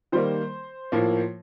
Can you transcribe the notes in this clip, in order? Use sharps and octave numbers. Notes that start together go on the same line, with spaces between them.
D#3 G3 A#3 C5
A2 F3 A#3